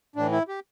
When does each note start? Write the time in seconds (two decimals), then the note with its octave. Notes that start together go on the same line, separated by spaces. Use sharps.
0.16 A2 E3 D4
0.32 E4
0.48 G4